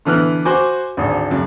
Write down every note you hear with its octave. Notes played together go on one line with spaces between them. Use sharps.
D3 E3 B3 F6 F#6
F#4 C5 G#5 D6
G#1 D2
F#2 C#3